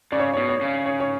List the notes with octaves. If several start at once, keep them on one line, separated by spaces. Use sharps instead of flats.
C#3 D5
C#5
B2 C#5
C#5
C#3
C#5
C#5